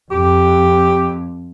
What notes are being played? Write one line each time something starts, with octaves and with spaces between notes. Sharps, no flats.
F2 G4